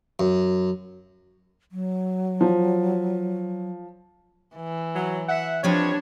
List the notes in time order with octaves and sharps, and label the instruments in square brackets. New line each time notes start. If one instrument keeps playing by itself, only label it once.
[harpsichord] F#2
[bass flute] F#3
[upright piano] F3
[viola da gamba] E3
[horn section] F#3
E5 F#5
[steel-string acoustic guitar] F3 C4 D#5 [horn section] G3 B4 C#5 [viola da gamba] D4